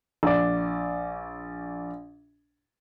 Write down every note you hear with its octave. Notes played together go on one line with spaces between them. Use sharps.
A#1 D5